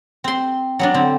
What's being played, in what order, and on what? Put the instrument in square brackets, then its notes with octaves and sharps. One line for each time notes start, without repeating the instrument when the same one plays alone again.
[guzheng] C4 C6
F#3 B3 D4
D3 C4